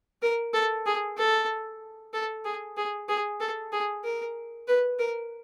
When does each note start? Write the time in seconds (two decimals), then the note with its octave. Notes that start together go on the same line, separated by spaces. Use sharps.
0.22 A#4
0.53 A4
0.86 G#4
1.18 A4
2.13 A4
2.45 G#4
2.77 G#4
3.08 G#4
3.40 A4
3.72 G#4
4.04 A#4
4.68 B4
4.99 A#4